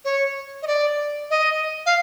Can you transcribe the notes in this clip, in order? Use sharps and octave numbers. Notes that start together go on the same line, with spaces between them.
C#5
D#5
D5
D#5
F5